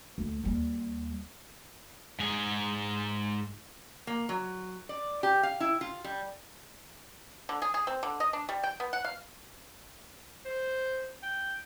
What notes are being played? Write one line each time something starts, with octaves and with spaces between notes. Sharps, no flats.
D2
D#2 G3
G#2 G#4
A#3
F#3
D5
G4
F5
E4
F4
G3
D3
G#4
G#4
C4
D3
D#5
D4
G3
G5
B3
F#5
F5
C5
G5